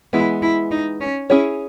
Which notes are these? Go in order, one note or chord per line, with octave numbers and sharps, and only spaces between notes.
E3 G#3 B3 E4
E4
D#4
C#4
C#4 E4 G#4 C#5